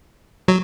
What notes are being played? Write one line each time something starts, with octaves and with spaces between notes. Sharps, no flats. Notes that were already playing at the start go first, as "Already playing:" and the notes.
F#3